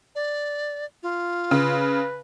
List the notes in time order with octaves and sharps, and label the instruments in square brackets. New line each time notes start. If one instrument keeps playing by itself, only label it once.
[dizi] D5
F4
[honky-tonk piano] C#3 [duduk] B4